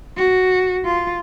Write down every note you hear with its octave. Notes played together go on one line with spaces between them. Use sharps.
F#4
F4